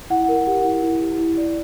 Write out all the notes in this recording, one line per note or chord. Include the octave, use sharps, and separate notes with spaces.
E4 F#5
A#4
G4
E4
E4
G4
E4
D5